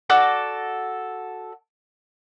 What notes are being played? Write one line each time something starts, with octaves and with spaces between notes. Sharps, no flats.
F#4 A4 D5